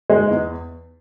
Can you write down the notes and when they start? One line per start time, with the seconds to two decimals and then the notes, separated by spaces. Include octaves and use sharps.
0.10 G#3
0.30 E2